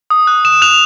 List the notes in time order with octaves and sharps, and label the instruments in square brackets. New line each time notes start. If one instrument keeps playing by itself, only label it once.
[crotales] D#6
F#6
D#6 E7
F#6 F7